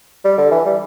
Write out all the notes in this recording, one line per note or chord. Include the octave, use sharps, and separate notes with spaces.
G3
D3
E3
G3